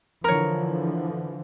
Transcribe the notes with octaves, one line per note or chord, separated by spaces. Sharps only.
D3 E3 F3 A#4 C#5